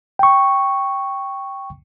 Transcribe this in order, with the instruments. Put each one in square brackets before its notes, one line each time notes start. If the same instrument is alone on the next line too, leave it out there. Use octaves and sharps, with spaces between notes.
[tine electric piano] G5 C#6